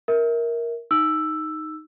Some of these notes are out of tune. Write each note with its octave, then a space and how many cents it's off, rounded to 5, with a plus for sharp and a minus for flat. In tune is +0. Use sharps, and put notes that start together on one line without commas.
A#4 +5 E5 -20
D#4 +0 E6 +5